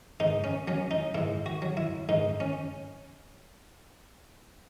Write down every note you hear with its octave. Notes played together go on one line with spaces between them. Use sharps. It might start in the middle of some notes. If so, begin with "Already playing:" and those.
G#2 D#4
C#4
F#3 C#4
D#4
G#2 E4
F#4
F#3
E4
G#2 D#4
C#4